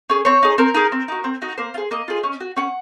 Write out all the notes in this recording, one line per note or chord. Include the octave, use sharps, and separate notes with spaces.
C#4 G#4
C4 C#5
D#4 G#4
C4 A#4
D#4 G#4
C4
D#4 F#4
C4
D#4 F#4
A#3 C5
F4
G#4
A#3 D#5
F4 G#4
C#4
F#4
C#4 F#5